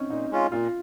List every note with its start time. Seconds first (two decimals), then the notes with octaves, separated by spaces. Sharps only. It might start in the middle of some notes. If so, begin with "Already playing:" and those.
Already playing: C4 C#4 D#4
0.10 A#2 D#4
0.31 G#3 C#4 F4
0.51 A#2 F4